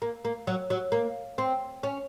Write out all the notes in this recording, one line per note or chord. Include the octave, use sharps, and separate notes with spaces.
A#3
A#3
F#3
F#3
A#3
C4
C#4